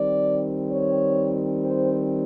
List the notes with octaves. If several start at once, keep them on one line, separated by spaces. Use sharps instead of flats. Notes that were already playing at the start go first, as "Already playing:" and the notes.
Already playing: D#3 G3 C4 D5
C#5
C5